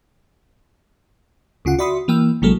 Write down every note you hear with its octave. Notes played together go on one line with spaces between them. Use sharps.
D2 C#3 F4 F#5
F#4 D5 E5 B5 C6 D#6
E3 A#3 G5 E6
A1 C3 F#3 G#3 A#3 A4